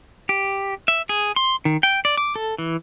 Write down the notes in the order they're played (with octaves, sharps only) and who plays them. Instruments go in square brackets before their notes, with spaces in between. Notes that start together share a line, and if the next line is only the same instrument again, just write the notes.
[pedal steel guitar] G4
E5
G#4
C6
D#3
G5
D5
D6
A4
E3